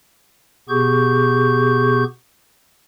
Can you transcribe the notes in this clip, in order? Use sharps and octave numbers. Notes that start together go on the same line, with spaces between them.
B2 B3 G4 G#4 C#6 G6